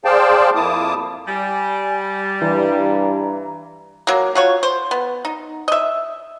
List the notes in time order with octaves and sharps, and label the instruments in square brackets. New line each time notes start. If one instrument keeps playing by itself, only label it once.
[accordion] G#4 C5 D5 F5 G5 A5
F2 A#3 E4 A5 D6 D#6
[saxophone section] G3 [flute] G#5
[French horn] G2 [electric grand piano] E3 [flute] A#5
[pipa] F#3 A#3
F4 F#4 C#5
C5
B3
D#4
D#5 E5